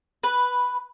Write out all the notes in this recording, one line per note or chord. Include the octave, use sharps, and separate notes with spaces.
B4